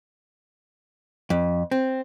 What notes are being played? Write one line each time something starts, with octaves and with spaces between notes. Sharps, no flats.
F2
C4